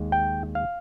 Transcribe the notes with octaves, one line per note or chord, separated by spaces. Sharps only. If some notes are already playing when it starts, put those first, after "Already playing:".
Already playing: D#2 G#3
G5
F5